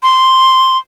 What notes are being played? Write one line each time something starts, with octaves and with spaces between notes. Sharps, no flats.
C6